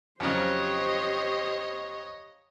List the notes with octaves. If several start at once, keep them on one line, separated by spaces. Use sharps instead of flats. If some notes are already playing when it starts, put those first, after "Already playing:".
F2 C#3 F#3 G4 C5 C#5 D#5